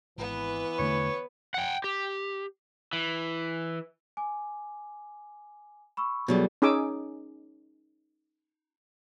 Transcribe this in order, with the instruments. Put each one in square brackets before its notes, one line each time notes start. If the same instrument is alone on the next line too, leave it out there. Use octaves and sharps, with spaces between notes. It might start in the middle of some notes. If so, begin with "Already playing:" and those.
[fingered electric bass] G#1 [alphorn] E3 [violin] B3 B4
[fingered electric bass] E2 D3 A3 [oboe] C#5
[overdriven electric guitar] F#5 G5
G4
E3
[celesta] G#5 D6
B5 C#6 E6
[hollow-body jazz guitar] B2 F#3 G3 [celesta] F4 G#4 A4
[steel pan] C#4 D#4 G#4 G#5 D6 E6